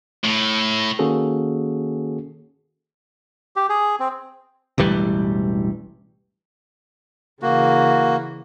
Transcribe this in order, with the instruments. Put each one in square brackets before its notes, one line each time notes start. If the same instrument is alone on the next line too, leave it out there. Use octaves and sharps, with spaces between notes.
[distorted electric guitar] A2
[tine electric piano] D#3 A#3 C#4 F#4 G#4 A4
[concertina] G4
G#4
C4
[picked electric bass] E1 A1 E3 G3
[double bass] C#3 E3 [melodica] A#3 F#4